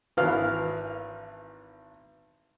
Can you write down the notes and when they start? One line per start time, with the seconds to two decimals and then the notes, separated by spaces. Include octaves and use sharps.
0.17 G#1 E3 F5